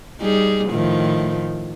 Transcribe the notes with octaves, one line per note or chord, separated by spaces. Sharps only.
G3 D#4 G#4
A2 D#3 F3